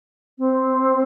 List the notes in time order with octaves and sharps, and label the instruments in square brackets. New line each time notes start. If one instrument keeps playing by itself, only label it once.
[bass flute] C4